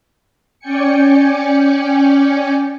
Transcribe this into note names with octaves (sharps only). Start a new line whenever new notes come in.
C#4 D5 G5 G#5 C#7